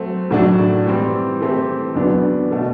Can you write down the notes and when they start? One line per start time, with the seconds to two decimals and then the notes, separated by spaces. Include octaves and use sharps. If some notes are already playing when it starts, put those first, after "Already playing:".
Already playing: F#3 A3 C4 F#4 C5
0.31 A2 F#3 A3 D4
0.86 E3 G3 C4
1.41 E3 A3 C4 G4 C5
1.95 E2 D3 F#3 B3 D4
2.51 B2 A3